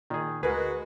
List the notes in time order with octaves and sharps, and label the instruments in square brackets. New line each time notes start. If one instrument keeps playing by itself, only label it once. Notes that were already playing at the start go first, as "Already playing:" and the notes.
[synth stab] A#2 [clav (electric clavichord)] D#3 G#4
[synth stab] D2 A#4 [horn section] G#3 F#4 [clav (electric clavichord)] G#4 [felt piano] B4